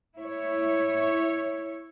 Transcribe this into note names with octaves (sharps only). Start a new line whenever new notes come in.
E4 C#5